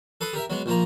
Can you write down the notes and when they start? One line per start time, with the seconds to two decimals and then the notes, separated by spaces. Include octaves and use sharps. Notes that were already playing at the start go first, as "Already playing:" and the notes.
0.21 A4 B4 C6 D#6
0.33 G4 A#4 E5
0.50 F#3 G#3 B3
0.66 A#1 F3 A#3 A#5